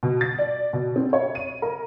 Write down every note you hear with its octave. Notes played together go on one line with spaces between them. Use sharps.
B2
A6
D5
B2
C4
C#5
D#7
A#4